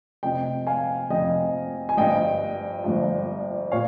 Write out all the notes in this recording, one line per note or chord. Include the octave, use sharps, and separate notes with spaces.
F1 F2 C3 D#5 G5
F5 G#5
F1 F2 C3 D#5 G5
G#5
G1 G2 F3 D#5 G5
G1 G2 F3
A#2 C#5 F5